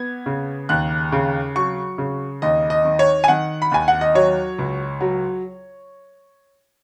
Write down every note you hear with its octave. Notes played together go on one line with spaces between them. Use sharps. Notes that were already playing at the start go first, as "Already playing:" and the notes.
Already playing: B3 G#6
C#3
D#2 F#6
C#3
F#3 C#6
C#3
D#2 D#5
D#5
D#3
C#5
G#5
D#3 F#5
B5
D#2 G#5
F#5
D#5
F#3 C#5
C#2
F#3